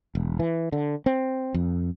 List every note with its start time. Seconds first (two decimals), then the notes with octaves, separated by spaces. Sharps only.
0.15 E1
0.39 E3
0.72 D3
1.06 C4
1.54 F2